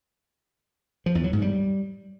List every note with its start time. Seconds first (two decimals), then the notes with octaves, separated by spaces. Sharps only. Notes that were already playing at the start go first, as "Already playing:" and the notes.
1.06 F3
1.15 E2
1.24 F#3
1.33 G#2
1.42 G3